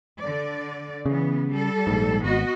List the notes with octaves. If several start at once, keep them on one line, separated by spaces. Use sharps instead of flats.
D3 D5
C#3 E3 B3
G3 A4
A#1 G#2
G#1 B3 F#4 D#5